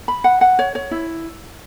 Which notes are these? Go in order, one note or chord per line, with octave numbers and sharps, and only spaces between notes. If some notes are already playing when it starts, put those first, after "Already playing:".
B5
F#5
F#5
C#5
C#5
E4